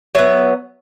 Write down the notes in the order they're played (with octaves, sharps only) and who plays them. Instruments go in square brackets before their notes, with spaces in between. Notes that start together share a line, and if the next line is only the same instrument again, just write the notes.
[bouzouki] F#3 B3 E5